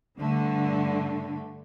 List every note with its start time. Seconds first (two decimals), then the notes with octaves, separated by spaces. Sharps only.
0.20 G2 D3 A3